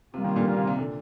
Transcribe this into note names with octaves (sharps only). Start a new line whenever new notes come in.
C3 G3 A#3 F4
C3 D#3
A#2 D3
A#2 D3
C3
C3
A#2 D3